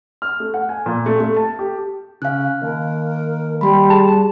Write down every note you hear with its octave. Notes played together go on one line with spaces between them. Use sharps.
F6
A3
F#5
G#5
A#2
A3
A3
A5
G4
C#3 F5 F#6
D#2 A#4
G3 B5 C6
G#4 A5